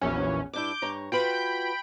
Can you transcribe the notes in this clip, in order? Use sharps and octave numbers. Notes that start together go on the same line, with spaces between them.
A#1 E2 F#3 C#4
G2 D4 E4 D6 G6
G2 C#5 A#5
F4 F#4 B4 G5 B5 D7